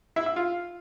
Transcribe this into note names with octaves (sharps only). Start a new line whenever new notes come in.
E4
E5
F4